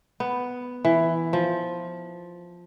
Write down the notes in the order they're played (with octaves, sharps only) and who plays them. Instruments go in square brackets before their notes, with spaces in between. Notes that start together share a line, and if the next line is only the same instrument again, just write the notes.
[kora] B3
E3
F3